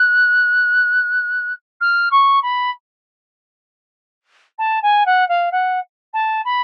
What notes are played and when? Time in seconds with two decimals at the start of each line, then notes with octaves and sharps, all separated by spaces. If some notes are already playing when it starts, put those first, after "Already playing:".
Already playing: F#6
1.80 F6
2.11 C#6
2.42 B5
4.58 A5
4.82 G#5
5.05 F#5
5.28 F5
5.51 F#5
6.13 A5
6.44 B5